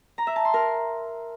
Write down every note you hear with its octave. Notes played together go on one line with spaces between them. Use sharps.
A#5
E5
A5
C6
A#4